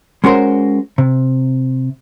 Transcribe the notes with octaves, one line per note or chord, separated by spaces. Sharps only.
G#3 C#4 F#4 A#4 C5
C3